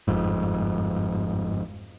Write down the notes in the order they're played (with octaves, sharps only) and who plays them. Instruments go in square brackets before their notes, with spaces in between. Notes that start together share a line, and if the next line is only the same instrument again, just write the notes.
[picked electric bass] G1 F2 G#2